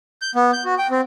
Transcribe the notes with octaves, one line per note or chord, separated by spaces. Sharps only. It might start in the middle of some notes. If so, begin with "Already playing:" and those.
G6
B3
G6
F#4
G5
C4